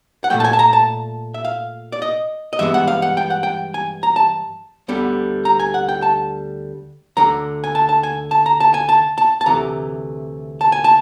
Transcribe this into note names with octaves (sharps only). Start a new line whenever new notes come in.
F#5
A#2 F#3 A3 G5
A5
G#5
A5
A#5
A5
E5
F5
D5
D#5
D#5
G2 E3 G#3 B3 E5
F#5
F5
F#5
G5
F#5
G5
G#5
A#5
A5
D2 D3 G3 B3
A#5
G#5
F#5
G5
A5
D2 D3 F#3 A#5
G#5
A5
A5
G#5
A5
A#5
A5
G#5
A5
A5
A5
D2 C3 E3 A3 A#5
A5
G#5
A5